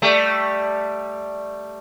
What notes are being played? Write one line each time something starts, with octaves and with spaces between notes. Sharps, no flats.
G3 A3